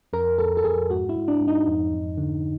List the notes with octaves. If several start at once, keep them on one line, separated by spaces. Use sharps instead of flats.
F2 A#4
F2 A4
A4
F2 G#4
G#2 F#4
E4
G#2
D4
G#2
D#4
F2
F2
D3